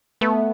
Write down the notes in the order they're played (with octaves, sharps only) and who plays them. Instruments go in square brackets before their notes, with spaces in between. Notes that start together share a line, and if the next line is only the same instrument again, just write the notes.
[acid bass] A3 [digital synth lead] B3